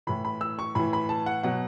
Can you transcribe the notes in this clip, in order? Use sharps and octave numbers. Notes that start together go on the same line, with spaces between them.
A2 E3 B5
B5
E6
C#6
A2 E3 B5
B5
A5
F#5
B2 F#3 F#5